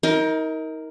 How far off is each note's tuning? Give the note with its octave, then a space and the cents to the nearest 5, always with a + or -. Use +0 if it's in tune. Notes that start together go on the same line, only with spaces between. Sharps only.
D#4 +35 A#4 +0